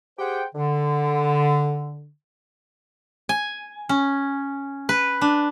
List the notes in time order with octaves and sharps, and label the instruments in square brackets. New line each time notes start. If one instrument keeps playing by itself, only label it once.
[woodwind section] G4 G#4 C5 F#5 G5
D3
[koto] G#5
C#4
B4
D4